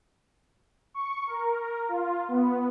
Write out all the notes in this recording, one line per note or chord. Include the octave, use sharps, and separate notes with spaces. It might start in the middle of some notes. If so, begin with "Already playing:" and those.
C#6
A#4
F4
B3